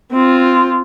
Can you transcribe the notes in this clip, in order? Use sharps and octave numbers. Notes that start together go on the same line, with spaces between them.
C4 F4